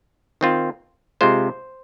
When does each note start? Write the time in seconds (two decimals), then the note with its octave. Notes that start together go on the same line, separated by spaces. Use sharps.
0.41 D#3 C4 F4
1.21 C3 G#3 F4 C5